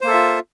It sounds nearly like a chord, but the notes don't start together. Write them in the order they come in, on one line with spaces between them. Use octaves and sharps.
C5 A#3 A4 E5 F4